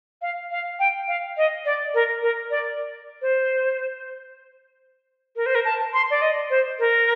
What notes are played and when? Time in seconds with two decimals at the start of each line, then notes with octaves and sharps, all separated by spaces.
0.22 F5
0.51 F5
0.79 G5
1.08 F5
1.37 D#5
1.65 D5
1.94 A#4
2.22 A#4
2.51 D5
3.22 C5
5.36 A#4
5.46 C5
5.55 A#4
5.65 A5
5.94 C6
6.11 D5
6.22 D#5
6.50 C5
6.79 A#4